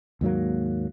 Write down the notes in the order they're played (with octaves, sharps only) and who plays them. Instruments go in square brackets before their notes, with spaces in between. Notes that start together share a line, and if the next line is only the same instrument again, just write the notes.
[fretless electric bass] D#2 G#2 F#3 A#3